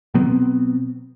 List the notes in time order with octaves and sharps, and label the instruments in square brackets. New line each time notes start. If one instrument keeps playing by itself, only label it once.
[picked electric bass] B2 F#3 B3 C4